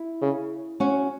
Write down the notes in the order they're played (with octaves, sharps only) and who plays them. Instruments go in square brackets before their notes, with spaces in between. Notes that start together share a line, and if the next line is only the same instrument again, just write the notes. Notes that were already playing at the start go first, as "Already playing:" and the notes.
Already playing: [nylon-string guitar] E4
[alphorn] C#3
[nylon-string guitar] C#4 F#4